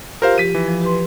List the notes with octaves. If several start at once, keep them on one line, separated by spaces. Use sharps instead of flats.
F4 G4 A#4 C5 F5
F3 G4 B6 D#7
E3
F3
G4 B4 C6